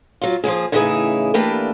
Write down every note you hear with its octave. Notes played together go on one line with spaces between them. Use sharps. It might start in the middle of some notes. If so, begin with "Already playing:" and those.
F#3 F4
F3 G3 A#3 G#4
A2 C#3 E3 D#4 E4 G#4
E3 A3 A#3 D4 G4 B4